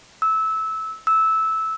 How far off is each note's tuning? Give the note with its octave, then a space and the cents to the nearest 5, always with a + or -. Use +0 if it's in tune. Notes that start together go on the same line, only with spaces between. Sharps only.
E6 -20
E6 -15